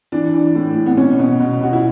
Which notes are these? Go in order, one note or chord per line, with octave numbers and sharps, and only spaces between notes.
E3 D4
E3
A2
A2
B3
B2 C#4
B2
B2
B2 F#4
E4